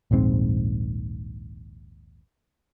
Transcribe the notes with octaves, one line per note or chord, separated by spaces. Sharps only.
D#1 A#1 G#2 C4